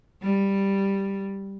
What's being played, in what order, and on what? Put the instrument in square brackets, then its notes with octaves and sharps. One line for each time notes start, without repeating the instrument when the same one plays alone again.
[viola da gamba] G3